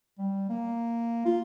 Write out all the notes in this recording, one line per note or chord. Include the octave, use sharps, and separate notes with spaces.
G3
A#3
F4